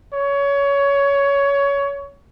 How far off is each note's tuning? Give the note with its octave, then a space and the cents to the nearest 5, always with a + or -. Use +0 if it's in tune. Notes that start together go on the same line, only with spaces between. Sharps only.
C#5 +20